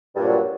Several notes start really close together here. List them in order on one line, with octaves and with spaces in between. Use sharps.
G2 A#2 F3 F#3